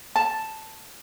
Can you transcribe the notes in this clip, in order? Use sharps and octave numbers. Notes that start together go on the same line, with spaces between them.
A5